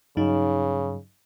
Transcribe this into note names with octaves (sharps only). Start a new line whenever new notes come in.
G2 C#3 F#3 D#4